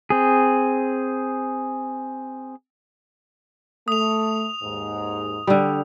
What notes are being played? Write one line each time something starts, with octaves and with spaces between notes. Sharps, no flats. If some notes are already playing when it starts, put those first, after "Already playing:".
C4 G#4
A3 D#6 F7
D#2 G#2
D3 G3